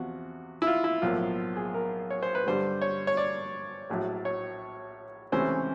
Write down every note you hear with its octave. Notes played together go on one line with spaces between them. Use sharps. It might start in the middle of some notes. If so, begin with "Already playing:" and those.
Already playing: E2 C3 F3 F#4
E4
F4
E4
B1 A2 F3 A#3 F4
G#4
A#4
C#5
C5
B4
G2 D3 G3 C5
C#5
C#5
D5
A#1 A2 F#3
C#5
C#2 C3 E3 A3 C#4 C5